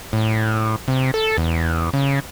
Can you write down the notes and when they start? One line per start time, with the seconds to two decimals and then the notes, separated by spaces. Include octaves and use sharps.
0.13 A2
0.88 C3
1.14 A4
1.38 E2
1.93 C#3